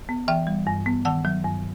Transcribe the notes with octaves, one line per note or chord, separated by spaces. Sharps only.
B3
E3 E5 G5
G3
G2
B3
D#3 F#5 A5
F#3
G2